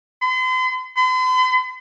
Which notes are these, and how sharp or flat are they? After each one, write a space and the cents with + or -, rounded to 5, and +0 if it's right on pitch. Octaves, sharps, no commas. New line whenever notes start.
C6 -40
C6 -45